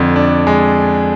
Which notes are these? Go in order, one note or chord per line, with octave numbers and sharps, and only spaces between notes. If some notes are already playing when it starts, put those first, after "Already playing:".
Already playing: F2 D3
D4
G#3